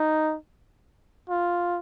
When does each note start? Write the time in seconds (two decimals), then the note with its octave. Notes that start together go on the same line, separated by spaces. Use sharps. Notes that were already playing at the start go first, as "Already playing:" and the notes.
Already playing: D#4
1.30 F4